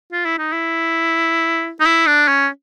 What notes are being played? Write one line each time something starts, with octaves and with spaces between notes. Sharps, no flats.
F4
E4
D#4
E4
D#4
E4
D4
C#4